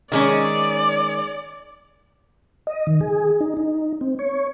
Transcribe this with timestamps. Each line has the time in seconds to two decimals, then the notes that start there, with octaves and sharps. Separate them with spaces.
0.12 D#3 G#3 C#4 D5
2.67 D#5
2.87 D#3
3.01 G#4
3.40 D#4
3.57 D#4
4.01 C4
4.19 C#5